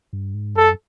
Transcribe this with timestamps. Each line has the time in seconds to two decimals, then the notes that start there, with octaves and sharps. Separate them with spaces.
0.13 G2
0.34 G#2
0.55 F#2 A4